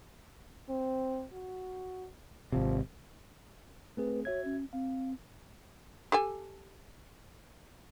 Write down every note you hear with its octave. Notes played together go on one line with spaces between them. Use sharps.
C4
F#4
G#1 C3 F3
A3 C4 G#4 B4
F#4 C#5 E5 G#6
C#4
C4 F5
G4 A4 G#5